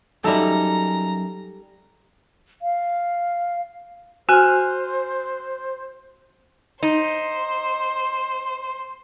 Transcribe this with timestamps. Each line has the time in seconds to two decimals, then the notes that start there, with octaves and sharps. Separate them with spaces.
0.24 F#2 G3 D#4 A4 E5 A#5
2.62 F5
4.29 F#4 C5 G#5 F6 F#6
6.83 D#4 C5